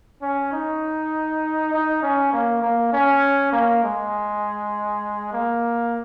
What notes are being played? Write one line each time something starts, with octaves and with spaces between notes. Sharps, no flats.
C#4
D#4
D#4
C#4
A#3
A#3
C#4
A#3
G#3
A#3